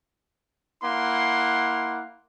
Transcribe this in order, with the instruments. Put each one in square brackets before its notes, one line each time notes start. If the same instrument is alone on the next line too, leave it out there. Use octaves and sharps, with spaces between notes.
[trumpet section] A#3 E4 F#5 C6